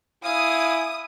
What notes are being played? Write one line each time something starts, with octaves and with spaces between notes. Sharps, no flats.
E4 F5 G#5 D#6